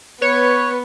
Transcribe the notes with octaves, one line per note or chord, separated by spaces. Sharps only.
B3 B4 C#5